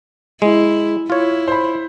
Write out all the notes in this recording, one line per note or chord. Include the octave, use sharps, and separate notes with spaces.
G#3 E4
E4 F4 C#5
C5 B5